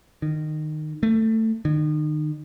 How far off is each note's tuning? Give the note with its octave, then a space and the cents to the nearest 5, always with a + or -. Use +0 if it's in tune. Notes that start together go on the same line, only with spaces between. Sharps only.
D#3 -20
A3 +20
D#3 -35